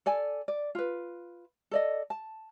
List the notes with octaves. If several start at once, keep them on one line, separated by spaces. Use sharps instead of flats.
A4 D5 G#5
D5
F4 B4
A4 D5 D#5
A5